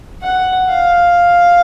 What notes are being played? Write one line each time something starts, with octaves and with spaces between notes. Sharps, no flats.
F#5
F5